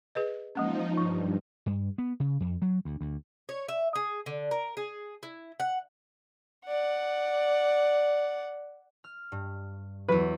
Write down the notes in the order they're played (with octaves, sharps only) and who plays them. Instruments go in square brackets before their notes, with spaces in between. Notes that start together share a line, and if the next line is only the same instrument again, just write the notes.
[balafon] G#4 B4 D#5
[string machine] F3 D#4 [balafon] G#3 A#3 C#4
[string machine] G2 [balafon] F3
[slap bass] G2
B3
C#3
F2
F#3
D2
D2
[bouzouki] C#5
E5
G#4
D3
A#4
G#4
E4
F#5
[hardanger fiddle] D5 F#5
[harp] F6
G2
[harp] E2 F#3 [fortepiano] B4